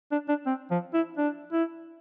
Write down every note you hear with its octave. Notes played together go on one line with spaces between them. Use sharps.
D4
D4
C4
F3
E4
D4
E4